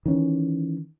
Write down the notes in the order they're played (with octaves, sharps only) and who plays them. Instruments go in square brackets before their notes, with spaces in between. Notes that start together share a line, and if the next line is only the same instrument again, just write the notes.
[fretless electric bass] D#3 E3 C#4